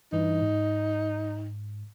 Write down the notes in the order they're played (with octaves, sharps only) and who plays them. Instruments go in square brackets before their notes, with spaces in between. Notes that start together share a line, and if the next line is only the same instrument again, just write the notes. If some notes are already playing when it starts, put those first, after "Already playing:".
[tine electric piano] G2 E3 [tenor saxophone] D#4
[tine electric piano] G#2